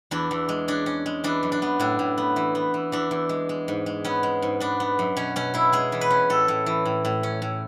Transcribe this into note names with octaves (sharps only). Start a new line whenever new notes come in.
E2 D4
E2
G#3
C#4 D4
C#4
G#3
E3 D4
F#2
D4
B3
A2 D4
A2
B3
E3
B3
E3
E2 D4
E2
G#3
G#3
G#2
G#3
B3 C#4
G#3
G#2
B3 D4
B3
F#2
B2 C#4
B2 C#4
B2 E4
G#3 G#4
E3
B4
C#4
A2 A4
A2
E3
A2
A2
C#4
A2